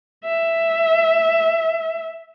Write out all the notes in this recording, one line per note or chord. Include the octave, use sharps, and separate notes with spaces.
E5